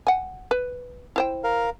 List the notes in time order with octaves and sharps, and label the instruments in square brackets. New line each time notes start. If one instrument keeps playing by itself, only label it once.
[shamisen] F#5 G#5
B4
E4 C5 G5
[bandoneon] A#4 F5